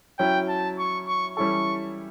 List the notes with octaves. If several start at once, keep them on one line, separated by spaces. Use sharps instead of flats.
F#3 C#4 E4 G5
A5
C#6
C#6
E3 G3 C#4 E4 A4 C#6